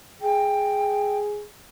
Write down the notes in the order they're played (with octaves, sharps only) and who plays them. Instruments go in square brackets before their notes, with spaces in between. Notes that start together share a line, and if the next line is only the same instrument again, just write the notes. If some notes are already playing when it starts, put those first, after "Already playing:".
[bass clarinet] G#4 [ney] G5